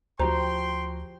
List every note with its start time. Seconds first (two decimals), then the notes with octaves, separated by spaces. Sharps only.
0.19 D2 F3 F#4 G4 C5 G5 A#5 C6